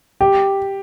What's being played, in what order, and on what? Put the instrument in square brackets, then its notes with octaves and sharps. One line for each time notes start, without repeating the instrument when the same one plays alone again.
[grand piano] G4